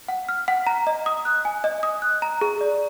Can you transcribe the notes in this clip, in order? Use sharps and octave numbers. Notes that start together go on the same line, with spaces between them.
F#5
F6
F#5
A#5
D#5
D#6
F#6
G#5
D#5
D#6
F#6
A#5
G#4
D5